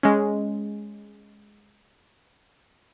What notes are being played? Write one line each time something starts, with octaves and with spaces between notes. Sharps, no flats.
G#3 C#4